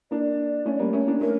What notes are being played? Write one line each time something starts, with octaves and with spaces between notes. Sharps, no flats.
A#3 D4 D5
A3 C#4
G3 A#3
A3 C#4
A#3 D4
A3 C#4 A#4